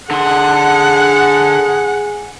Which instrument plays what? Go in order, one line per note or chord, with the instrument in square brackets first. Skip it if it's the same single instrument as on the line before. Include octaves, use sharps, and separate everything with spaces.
[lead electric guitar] D3 C6 [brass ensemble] G#4 [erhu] F#5